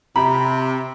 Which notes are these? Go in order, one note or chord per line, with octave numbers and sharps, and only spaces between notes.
C3 A#5 B5